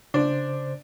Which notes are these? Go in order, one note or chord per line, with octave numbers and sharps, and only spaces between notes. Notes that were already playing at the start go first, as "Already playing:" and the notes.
C#3 D4 C5